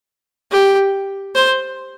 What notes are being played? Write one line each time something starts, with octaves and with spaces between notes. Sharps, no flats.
G4
C5